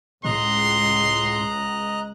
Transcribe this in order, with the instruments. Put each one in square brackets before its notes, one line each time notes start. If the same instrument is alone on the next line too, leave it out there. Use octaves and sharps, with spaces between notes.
[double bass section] C#2 [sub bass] A2 [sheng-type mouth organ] D#5 A#5 F#6 [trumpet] C6